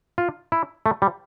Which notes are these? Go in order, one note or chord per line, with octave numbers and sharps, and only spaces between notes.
F4
E4
A3
G3